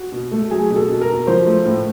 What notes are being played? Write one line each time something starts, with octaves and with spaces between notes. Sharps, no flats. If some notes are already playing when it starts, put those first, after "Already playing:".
Already playing: F#4
B2
A3
F#3 G#4
B2
A4
B2
A#4
B2
F3 C5
A3
A2